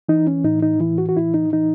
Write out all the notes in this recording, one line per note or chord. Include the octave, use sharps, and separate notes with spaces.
E3 D#4
C#4
A2 D#4
D#4
E3 E4
F#4
F#4
A2 E4
D#4
E3 D#4